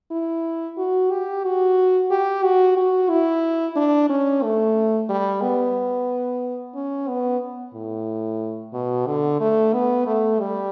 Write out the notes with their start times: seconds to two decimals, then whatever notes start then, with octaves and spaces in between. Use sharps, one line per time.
0.11 E4
0.78 F#4
1.11 G4
1.44 F#4
2.11 G4
2.44 F#4
2.77 F#4
3.10 E4
3.76 D4
4.10 C#4
4.43 A3
5.09 G3
5.42 B3
6.75 C#4
7.08 B3
7.74 A2
8.73 B2
9.07 D3
9.40 A3
9.73 B3
10.06 A3
10.39 G3